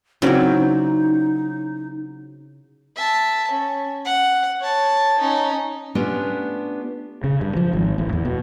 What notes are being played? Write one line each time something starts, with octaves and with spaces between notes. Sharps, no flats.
C#3 F#3 C4 C#4 D#4 E4 D5
E5 A5
C#4
F#5
C#5 A5
C#4 D#4
A3 B3 C#4 D4 F4 G4
C#3
G2
F3
G#1
A1
E2
B2